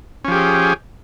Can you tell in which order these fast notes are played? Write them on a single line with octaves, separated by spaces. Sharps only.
C#4 F3 G4 G#4